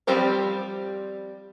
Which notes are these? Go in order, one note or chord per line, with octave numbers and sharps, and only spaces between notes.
F3 G3 C4 G4 C5